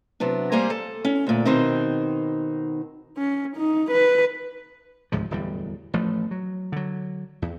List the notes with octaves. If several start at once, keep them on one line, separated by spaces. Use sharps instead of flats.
C3 F#3 B3 D4
G3 A#3 C5 G#5 A#5
A4
C#4
D2 A#2
B2 D#3 C4 D#4
C#4
D#4
B4
G1 C#2 G#2 F3
D1 E2 G3
A1 F3 A3
F#3
D3 F#3
E2